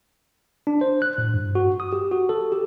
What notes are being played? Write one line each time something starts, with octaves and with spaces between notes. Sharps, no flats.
D4
C5
F#6
A2
G2
F#4
D#6
G4
F#4
A4
G4